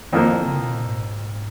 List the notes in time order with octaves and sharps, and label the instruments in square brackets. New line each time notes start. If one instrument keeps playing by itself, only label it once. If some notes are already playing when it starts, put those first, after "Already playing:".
[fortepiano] F2 F3 A#3 [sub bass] D#3
[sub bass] C#3
B2
A#2
G#2